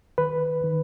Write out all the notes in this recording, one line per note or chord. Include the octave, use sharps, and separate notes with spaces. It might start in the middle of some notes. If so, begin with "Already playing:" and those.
D#3 B4
D#3